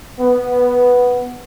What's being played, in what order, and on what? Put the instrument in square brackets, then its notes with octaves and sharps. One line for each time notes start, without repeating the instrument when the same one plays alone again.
[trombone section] B3